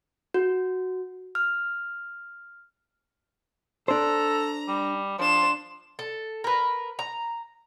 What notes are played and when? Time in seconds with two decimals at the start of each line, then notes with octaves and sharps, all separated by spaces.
0.34 F#4
1.35 F6
3.88 D4 A4 C5 A#5
4.68 G3
5.19 F3 D4 C6 E7
5.99 A4
6.44 A#4 B4
6.99 A#5